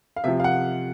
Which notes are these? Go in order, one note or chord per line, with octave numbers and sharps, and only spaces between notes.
F5
C3 F3 E5
F5
F#5